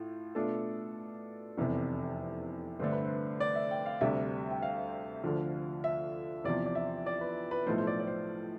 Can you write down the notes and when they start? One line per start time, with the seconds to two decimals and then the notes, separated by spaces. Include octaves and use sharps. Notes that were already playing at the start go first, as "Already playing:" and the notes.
Already playing: A2 F4
0.35 B2 A3 D4 F4 A4
1.58 F1 E2 C3
2.79 G2 D3 A3 C5
2.92 B4
3.05 C5
3.40 D5
3.55 E5
3.71 G5
3.86 F5
4.01 D2 C3 G3 E5
4.51 G5
4.62 F5
5.24 D2 D3 F3
5.84 E5
6.44 E2 C3 F3 D5
6.66 D5
6.75 E5
7.06 D5
7.21 B4
7.51 B4
7.67 B1 A2 F3 A3 C5
7.78 C5
7.87 D5
8.00 D5
8.07 C5